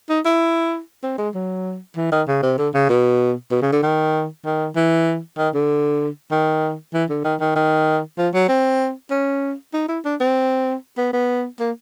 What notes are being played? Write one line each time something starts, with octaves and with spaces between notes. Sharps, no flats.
D#4
E4
C4
G#3
F#3
E3
D#3
C#3
C3
D3
C#3
B2
B2
C#3
D3
D#3
D#3
E3
D#3
D3
D#3
E3
D3
D#3
D#3
D#3
F3
F#3
C4
C#4
D#4
E4
D4
C4
B3
B3
A#3